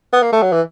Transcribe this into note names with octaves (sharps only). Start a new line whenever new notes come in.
B3
A#3
A3
F#3
E3